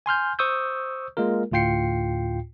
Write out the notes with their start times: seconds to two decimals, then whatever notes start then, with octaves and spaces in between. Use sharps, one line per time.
0.06 G#5 C6 F6 G6
0.39 C5 C#6 D#6 E6 G6
1.17 G#3 A#3 F4 A#4
1.52 D2 A2 F4 G5 C7 C#7